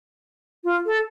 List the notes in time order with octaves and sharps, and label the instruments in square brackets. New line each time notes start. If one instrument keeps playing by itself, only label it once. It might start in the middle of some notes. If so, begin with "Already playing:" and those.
[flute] F4
A4